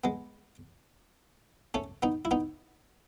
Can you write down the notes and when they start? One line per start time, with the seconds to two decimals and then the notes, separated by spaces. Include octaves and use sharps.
0.04 G#3 B3
1.74 A3 C#4
2.02 B3 D#4
2.25 E4
2.31 B3 D#4